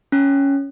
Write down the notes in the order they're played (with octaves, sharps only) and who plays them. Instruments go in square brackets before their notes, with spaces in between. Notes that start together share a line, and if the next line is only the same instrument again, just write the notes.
[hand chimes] C#4